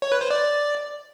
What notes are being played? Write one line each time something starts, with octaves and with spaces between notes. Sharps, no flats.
C#5
B4
C5
D5